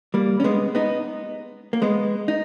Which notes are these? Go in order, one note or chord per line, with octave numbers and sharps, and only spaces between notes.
G3 A#3
C#4
G#3 B3
B3 D#4
A#3
G#3 B3
D#4